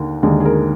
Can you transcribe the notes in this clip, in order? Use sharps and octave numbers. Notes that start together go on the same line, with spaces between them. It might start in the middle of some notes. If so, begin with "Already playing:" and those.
Already playing: D#2 D3 A#4
D#2 D3 G#3 G#4
G#4
A#4